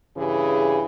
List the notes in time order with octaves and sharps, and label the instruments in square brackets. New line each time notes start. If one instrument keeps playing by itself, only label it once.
[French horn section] G2 C#3 E3 G4 G#4